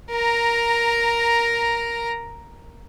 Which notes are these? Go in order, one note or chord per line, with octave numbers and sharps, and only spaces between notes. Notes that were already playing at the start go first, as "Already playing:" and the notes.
A#4 A#5